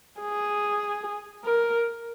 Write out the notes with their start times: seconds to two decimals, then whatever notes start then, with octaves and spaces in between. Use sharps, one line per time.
0.21 G#4
1.45 A#4